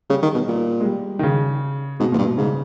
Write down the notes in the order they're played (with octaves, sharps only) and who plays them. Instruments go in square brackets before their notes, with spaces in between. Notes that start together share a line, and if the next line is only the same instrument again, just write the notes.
[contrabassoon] C#3 [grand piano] G3
[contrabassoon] D#3
B2
A#2
[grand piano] G#3
G3
D#3
C#3
[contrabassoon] G#2 [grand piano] B2
[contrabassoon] E2 [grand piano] A#2
[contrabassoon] G2
[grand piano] B2
[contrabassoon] G#2 [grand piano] C#3